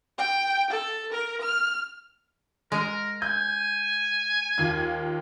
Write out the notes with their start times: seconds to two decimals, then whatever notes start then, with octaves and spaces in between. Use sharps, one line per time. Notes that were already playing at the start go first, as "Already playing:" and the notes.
0.18 G5
0.70 A4
1.12 A#4
1.42 F6
2.72 G#3 A#4
3.22 G#5 G6
4.58 D#2 F4 G#6